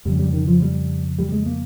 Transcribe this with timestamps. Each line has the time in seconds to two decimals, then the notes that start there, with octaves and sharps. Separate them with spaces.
0.05 F2 C#3 G3
0.19 G3
0.33 D#3
0.47 F3
0.62 G3
1.19 G3
1.32 G#3
1.46 A#3